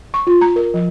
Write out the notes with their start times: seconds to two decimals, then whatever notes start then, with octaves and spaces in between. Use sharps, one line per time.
0.14 C#6
0.27 F4
0.41 A#5
0.56 A#4
0.74 F3